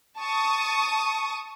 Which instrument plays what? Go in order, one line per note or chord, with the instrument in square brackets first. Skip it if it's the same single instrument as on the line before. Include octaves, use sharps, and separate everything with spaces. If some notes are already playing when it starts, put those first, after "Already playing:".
[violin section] A5 C#6 D#6